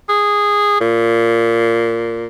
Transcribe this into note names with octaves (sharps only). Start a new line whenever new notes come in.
G#4
A#2